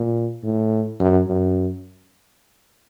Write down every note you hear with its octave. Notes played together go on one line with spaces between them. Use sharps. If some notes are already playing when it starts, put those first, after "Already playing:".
Already playing: A#2
A2
F#2
F#2